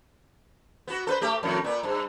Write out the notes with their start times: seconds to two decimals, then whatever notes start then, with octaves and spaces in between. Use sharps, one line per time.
0.87 B3 F#4
1.07 A4 B4 C5
1.21 A3 G4
1.43 F2 A2 D#3
1.64 A#2 B3
1.83 G2